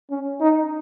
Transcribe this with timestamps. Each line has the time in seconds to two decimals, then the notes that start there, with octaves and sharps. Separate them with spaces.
0.10 C#4
0.41 D#4